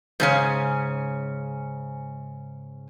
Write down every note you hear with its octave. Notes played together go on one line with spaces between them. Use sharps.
G#2 C#3 C#4